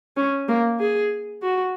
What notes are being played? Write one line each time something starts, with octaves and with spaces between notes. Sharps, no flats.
C#4
A#3
G#4
F#4